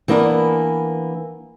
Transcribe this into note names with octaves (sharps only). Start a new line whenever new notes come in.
E3 A#3 B3 D4 A#4